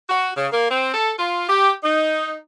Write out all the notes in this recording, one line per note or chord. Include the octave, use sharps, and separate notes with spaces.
F#4
C#3
A#3
C4
A4
F4
G4
D#4